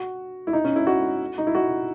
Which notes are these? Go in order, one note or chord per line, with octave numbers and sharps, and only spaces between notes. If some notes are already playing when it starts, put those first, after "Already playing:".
Already playing: F#4
E4
D#4
C#4
E4
F#4
D#4
E4
F#4